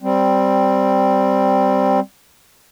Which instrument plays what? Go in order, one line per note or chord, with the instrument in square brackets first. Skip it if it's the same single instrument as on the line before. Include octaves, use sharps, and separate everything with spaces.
[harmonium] G3 C4